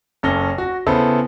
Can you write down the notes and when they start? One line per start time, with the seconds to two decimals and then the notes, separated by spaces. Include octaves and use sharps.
0.23 F#1 C#4 A4 A#6 G7
0.58 F#4
0.87 C#3 B3 E4 A4 C5